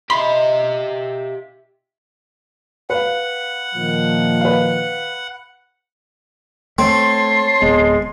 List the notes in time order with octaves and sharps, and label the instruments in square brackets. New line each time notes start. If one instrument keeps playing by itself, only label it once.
[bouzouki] D#4 F4 D#5 [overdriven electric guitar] G4 E5 [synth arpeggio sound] B5 C6
[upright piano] B4 F5 [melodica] F#5
[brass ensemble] A#2 D#3 F3
[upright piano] B4 F5
[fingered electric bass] A3 [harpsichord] C4 [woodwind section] C#5 A5 C6
[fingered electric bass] D1 B3 [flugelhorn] G#3